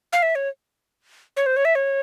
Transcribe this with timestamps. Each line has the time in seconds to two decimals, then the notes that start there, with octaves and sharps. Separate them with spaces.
0.13 F5
0.23 E5
0.35 C#5
1.37 C#5
1.46 C5
1.56 C#5
1.65 E5
1.75 C#5